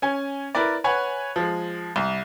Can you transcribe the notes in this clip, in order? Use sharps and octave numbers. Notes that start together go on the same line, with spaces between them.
C#4 G#5
E4 A#4 B4 D5
B4 C#5 F#5 G#5
F3 G#3
C2